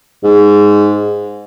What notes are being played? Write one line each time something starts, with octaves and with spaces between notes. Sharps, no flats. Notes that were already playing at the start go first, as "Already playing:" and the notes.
G#2